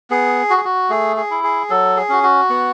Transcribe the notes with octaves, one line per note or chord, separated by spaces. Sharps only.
B3 G#4
F#4
G#4
F#4
A3 G#4
G#4
E4
G#4
F#3 A4
G#4
C#4 F#4
F#4
B3